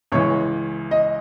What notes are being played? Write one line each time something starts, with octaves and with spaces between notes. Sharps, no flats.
C#2 C#3 E3 C#5
D#5